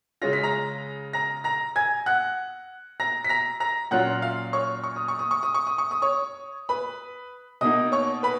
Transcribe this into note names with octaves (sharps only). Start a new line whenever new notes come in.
C#3 G#3 C#4 F4 A#6
B6
A#5 A#6
A#5 A#6
A#5 A#6
G#5 G#6
F#5 F#6
A#5 A#6
B6
A#5 A#6
A#5 A#6
A#2 F#3 C#4 F4 F#5 F#6
F5 F6
C#5 C#6
C#6
D#6
C#6
D#6
C#6
D#6
C#6
D#6
C#6
D#6
C#5 C#6
B4 B5
B2 A#3 D#4 D#5 D#6
C#5 C#6
B4 B5